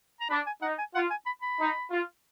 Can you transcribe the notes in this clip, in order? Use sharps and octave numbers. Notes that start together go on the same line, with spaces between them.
A#5
D4 B5
G#5
D#4 F#5
G#5
F4 F#5
G#5
B5
B5
D#4
F4